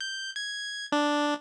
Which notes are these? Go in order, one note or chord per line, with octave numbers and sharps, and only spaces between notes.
G6
G#6
D4